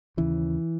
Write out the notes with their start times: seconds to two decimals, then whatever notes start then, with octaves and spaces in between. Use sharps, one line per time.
0.17 D#2 C#3 E3